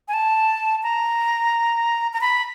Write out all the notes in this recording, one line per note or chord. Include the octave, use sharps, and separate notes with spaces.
G#5
A5
A#5
A#5
B5